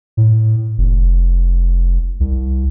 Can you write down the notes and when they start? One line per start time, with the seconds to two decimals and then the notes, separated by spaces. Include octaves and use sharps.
0.17 A2
0.78 F1
2.20 C2